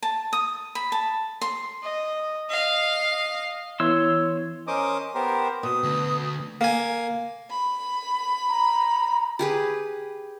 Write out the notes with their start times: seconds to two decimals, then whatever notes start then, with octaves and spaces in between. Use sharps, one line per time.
0.03 A5
0.33 D#6
0.75 B5
0.92 A5
1.41 C6
1.82 D#5
2.50 D#5 F5
3.80 E3 B3 E4 C#5 C6 E6
4.67 C#4 A#4 C5 D#5 D6 D#6
5.15 B3 G4 A#4 C5
5.63 B2 A4 D#6
5.83 D2
6.61 A#3 G#5
7.50 B5
8.49 A#5
9.39 G4 G#4 B4